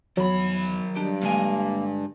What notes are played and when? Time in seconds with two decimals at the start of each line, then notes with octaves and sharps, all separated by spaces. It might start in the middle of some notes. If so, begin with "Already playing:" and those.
0.17 E2 D#3 F#3 B5
0.96 G2 D4 G4
1.23 D3 G#3 A#3 G#5